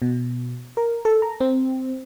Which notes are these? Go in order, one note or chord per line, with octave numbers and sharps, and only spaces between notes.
B2
A#4
A4
A#5
C4